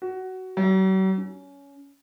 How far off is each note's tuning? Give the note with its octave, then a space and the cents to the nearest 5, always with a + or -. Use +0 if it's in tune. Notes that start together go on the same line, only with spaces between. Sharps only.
F#4 +15
F#3 +45
C#4 +20